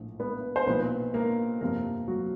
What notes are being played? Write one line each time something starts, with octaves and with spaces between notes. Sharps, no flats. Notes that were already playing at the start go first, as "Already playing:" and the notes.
Already playing: A#1 A2 F3
B3 B4
C5
B1 A#2 F3 B3 B4
A#3 A#4
G1 F2 C3 F3 A#3 A#4
F#3 F#4